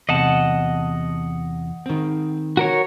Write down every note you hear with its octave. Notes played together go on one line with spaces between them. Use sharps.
E2 C3 D#5 F#5 A5
D#3 C4
F#4 A#4 C#5